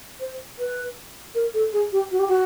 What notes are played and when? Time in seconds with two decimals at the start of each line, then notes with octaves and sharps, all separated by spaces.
0.20 C5
0.59 B4
1.35 A#4
1.54 A4
1.73 G#4
1.92 G4
2.11 F#4
2.19 G4
2.28 F#4